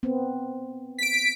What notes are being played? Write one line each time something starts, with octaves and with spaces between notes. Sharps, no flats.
B3 C4
B6 D7